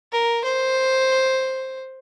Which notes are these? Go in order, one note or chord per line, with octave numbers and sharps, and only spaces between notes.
A#4
C5